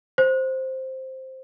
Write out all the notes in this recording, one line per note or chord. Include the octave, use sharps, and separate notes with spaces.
C5